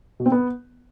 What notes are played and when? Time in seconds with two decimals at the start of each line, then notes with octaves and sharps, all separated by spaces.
0.20 B2
0.26 C4
0.32 B3